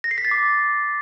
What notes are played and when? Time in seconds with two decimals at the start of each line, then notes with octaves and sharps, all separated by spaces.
0.04 A#6
0.11 C7
0.18 B6
0.25 A6
0.31 D6